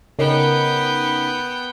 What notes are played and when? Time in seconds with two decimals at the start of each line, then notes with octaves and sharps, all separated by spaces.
0.19 C#3 B3 C#4 D#4 A#4 G5